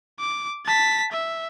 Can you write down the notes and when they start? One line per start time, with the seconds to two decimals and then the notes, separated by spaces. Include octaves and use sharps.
0.19 D6
0.66 A5 B6
1.12 E5